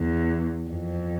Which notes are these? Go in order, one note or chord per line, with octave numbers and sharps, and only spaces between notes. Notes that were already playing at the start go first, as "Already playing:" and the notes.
Already playing: E2
F2